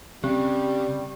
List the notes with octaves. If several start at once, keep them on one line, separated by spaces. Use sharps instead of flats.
C#3 G3 C4 C#4 G4